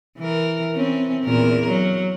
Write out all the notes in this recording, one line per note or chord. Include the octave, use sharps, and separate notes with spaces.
E3 A#4
E3 C4 C#4
E2 A#2 A#4
F#3